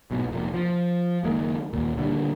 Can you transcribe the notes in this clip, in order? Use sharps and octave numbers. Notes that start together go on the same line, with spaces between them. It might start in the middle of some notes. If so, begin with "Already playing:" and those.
B1 G#2 B2
F1 A#2
F3
F#1 D#3 G#3 A#3
D#2 A#2
A#2 D3 F#3 G3